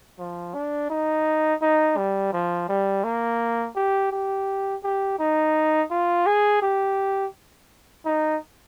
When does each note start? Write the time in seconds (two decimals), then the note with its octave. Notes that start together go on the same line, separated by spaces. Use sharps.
0.19 F3
0.54 D4
0.90 D#4
1.62 D#4
1.97 G3
2.33 F3
2.69 G3
3.04 A#3
3.76 G4
4.12 G4
4.84 G4
5.19 D#4
5.91 F4
6.26 G#4
6.62 G4
8.05 D#4